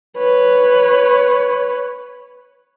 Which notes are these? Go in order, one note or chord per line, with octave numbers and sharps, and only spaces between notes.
B4 C#5